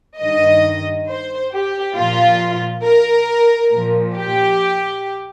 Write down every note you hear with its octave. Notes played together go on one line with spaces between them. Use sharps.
G2 D#3 D#5
C5
G4
A#2 F3 F4
A#4
A#2 F3
G4